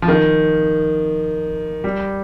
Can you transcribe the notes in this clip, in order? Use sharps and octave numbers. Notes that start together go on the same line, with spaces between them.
F3
D#3
G3